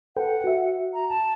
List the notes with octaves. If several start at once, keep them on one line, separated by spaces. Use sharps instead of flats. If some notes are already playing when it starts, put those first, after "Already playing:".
A4 B4 F#5 G5
F#4 E5
A#5
A5